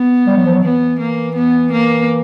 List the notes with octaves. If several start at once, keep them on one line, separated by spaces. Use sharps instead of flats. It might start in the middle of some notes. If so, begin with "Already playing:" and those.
Already playing: B3
G3
F#3
F3
F#3
E3 B3
A#3
B3
A#3